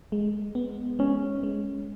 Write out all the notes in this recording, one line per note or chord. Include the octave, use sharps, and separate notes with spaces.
G#3
B3
G#3 C#4
G#3